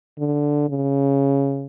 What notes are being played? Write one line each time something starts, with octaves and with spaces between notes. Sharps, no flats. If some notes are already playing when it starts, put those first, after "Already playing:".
D3
C#3